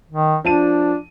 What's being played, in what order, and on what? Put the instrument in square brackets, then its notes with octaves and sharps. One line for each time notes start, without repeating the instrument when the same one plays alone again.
[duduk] D#3
[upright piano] F3 A5 D#7 [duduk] D4